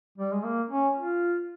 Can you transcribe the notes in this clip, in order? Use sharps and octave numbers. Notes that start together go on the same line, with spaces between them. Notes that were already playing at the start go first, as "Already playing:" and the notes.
G3
G#3
A#3
C#4
F4